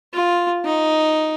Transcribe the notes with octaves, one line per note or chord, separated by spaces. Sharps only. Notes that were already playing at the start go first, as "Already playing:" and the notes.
F4
D#4